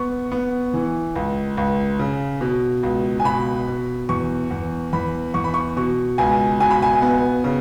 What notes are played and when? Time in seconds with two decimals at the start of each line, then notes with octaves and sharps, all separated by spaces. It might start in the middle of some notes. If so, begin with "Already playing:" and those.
Already playing: B3 C#6
0.32 B3
0.74 E3
1.15 C#2
1.57 C#2
1.99 C#3
2.41 B2
2.83 C#2
3.20 G#5
3.24 B2 B5
3.67 B2
4.09 E2 C#6
4.51 E2
4.93 E2 B5
5.34 E2 C#6
5.44 B5
5.54 C#6
5.77 B2 C#6
6.18 C#2 G#5
6.60 B2 G#5
6.71 B5
6.82 G#5
7.02 B3
7.44 C#3